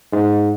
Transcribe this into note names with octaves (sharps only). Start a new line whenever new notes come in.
G#2